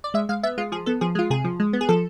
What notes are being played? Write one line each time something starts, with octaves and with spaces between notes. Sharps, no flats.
D5
G#3 E5
G#3 F5
B3 E5
G#3 F4
F3 G#4
B3 A4
F3 G#4
G#3 F4
C3 G#4
F3
G#3
B3
G#4
F3 A4